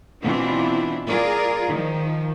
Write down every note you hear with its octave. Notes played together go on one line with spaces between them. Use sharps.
B2 E3 C4 D4 E4 F4
F4 G#4 A#4 D5
D#3 F3